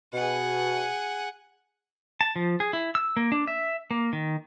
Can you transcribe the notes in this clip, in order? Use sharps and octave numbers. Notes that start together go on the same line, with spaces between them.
B2 G#4 F#5
A5
F3
G#4
E4
E6
A#3
D4
E5
A#3
D#3